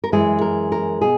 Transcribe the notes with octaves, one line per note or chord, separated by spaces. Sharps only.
A#4
F#2 E3 G#3 G#4
A#4
A#4
B2 G#4